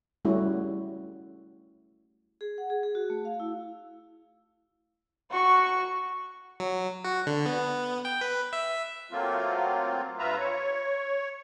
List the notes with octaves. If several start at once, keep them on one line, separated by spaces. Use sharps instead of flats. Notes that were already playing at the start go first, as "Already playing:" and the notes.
G3 A3 C#4 E4 F#4
G#4
F#5
G#4
G#4
F#4
A3
F5
E4
F#4 C#6
F#3
F#4
D3
B3
G5
B4
E5
F#3 A3 A#3 C4 F4
G2 F4 B4 E5 A#5
C#5